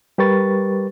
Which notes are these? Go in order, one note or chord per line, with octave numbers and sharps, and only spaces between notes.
G3 G4 A#4 B4 C#6 A6